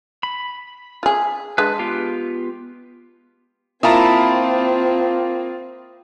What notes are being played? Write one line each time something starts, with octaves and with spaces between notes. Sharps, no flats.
B5
F4 G#4
G#3 D4 B4
B3 F4 G4
A#3 C4 E4 F4 A5 A#5 D#6